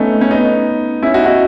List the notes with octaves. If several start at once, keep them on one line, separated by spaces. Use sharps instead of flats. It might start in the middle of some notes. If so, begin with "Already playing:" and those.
Already playing: A3 B3 C#4 D#4
C#4
B3 D#4
C#4 E4
D#4 F#4
D#4 F#4